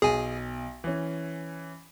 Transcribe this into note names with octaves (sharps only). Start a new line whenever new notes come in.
B1 G#4 G#5
E3 C#4